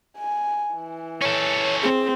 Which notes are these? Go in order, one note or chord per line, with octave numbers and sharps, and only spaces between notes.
G#5
E3
C#4 A4 C#5
C4 G#4